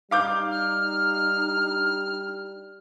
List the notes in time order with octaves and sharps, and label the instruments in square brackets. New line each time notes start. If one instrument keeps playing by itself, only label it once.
[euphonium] G3 [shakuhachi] D#4 [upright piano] F5 D6 G6
[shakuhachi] D#4 [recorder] F6